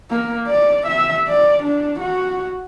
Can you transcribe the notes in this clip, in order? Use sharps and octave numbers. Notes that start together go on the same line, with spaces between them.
A#3
D5
E5
D5
D4
F#4